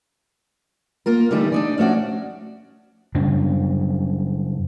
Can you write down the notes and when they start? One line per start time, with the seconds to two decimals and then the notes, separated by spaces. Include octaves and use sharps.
1.06 A#3 F4 A#4
1.31 D3 E3 G3 A3 D#4 G4
1.52 D4 D#4 D5
1.78 F3 A3 C#4 F#4 D5
3.15 F#2 C#3 G3 D4